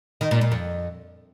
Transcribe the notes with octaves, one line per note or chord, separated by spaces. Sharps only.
D#3
A#2
A#2
F2